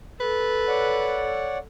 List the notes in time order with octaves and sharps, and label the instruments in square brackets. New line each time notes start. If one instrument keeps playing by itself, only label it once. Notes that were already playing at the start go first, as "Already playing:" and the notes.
[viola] A4 [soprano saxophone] B4
[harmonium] C#5 D5 F#5